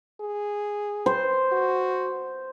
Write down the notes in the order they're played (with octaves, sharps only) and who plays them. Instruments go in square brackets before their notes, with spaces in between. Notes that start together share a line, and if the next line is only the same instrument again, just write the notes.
[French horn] G#4
[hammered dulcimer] C5
[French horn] F#4